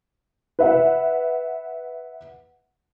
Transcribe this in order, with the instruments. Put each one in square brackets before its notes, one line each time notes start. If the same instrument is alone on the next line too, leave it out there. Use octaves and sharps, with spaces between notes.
[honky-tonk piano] B4 E5 F#5